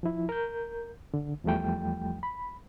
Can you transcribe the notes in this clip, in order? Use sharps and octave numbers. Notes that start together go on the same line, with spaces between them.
F3 E4
A#4 G6
D3
E2 F3 G3 A3 G5
B5